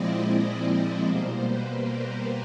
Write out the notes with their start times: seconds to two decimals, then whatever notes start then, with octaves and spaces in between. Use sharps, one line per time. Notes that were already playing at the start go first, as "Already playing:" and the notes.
Already playing: A#2 F3 G#3 C4 E4 D5 D#5
0.22 D5
1.03 B2 G3 A#3 C5
1.44 B4
1.85 A#4